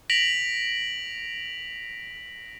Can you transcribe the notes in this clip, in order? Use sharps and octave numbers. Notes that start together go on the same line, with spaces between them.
A#6 B6 D7 F7 F#7